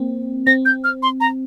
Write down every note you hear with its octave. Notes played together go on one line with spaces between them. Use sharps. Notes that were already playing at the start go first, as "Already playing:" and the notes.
Already playing: A#3 C4
C4 A#6
G6
F6
C6
A#5